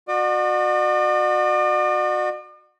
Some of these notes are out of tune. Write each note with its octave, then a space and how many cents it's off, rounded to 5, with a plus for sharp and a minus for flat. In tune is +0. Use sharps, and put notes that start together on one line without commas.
F#4 -25 D5 +45